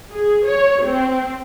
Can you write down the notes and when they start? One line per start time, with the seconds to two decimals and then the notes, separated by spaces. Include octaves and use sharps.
0.13 G#4
0.46 C#5
0.85 C4